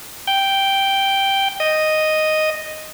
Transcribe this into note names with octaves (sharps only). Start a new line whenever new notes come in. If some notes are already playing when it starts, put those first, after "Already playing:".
G5
D#5